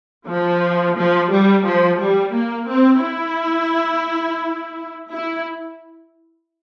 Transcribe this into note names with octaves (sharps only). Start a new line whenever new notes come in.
F3
F3
G3
F3
G3
A#3
C4
E4
E4